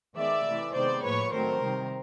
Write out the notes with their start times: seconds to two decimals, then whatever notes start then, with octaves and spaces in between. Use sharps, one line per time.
0.16 D#3 G#3 B3 D5 E5
0.45 C3 E3 A3
0.73 C3 D#3 G#3 B3 C5 D5
1.03 A2 F3 A#3 B4 C#5
1.32 D#3 F#3 A3 C4 A#4 C5
1.61 C3 D#3 G3